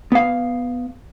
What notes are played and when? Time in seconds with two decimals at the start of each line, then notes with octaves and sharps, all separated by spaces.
0.12 B3 F5